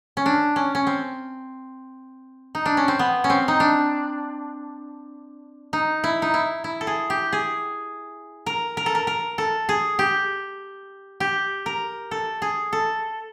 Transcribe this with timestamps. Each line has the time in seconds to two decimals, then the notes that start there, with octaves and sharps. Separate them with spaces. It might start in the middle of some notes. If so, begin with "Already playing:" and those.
0.17 C#4
0.26 D4
0.56 C#4
0.75 C#4
0.87 C4
2.55 D#4
2.66 D4
2.77 C#4
2.88 C4
2.99 B3
3.24 C#4
3.30 C4
3.48 D#4
3.60 D4
5.73 D#4
6.04 E4
6.22 D#4
6.34 E4
6.64 E4
6.81 A4
6.87 G#4
7.10 G4
7.32 G#4
8.46 A#4
8.77 A#4
8.86 A4
8.95 A#4
9.07 A#4
9.38 A4
9.69 G#4
9.99 G4
11.20 G4
11.66 A#4
12.11 A4
12.42 G#4
12.73 A4